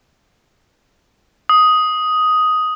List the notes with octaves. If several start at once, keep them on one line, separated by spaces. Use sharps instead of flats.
D#6